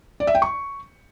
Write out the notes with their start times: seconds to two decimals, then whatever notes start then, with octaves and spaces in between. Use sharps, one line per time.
0.20 D5
0.27 E5
0.35 G5
0.42 C#6